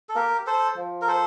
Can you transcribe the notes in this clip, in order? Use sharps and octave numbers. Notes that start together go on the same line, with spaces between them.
A4
A#3 G4 A#4
A4 C5
F3
A#4
A4 C5